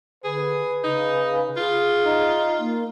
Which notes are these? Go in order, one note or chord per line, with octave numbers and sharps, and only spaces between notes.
D3 G#4 B4
C#3 D#4
F4 G#4
D#4
A#3